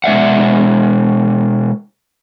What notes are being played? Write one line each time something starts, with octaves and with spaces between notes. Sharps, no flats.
B2 G#3 D5 E5 F#5